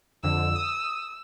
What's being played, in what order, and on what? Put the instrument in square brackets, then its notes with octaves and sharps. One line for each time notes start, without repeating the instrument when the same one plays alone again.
[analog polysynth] F2 D3 [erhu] E6
[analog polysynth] D#6